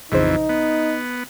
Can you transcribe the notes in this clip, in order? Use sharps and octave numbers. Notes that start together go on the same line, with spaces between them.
A#1 F2 C#3 E3 D#4 C5
B3